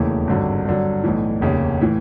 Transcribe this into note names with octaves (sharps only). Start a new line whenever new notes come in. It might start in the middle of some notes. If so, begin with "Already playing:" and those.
Already playing: E1 D#2 C#3 E3 A3
G#1 G2 D3 F#3
G2 D3 F#3
B1 A2 E3
F1 D#2 C#3
A2 E3